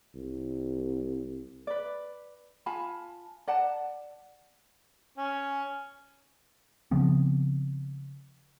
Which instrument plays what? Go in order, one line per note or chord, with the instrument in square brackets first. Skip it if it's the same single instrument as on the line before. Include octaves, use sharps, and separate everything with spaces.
[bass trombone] C2
[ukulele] B4 D5
F4 G#5 A5 B5
D5 F#5 A5
[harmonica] C#4
[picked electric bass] C#3 F3 B3 C4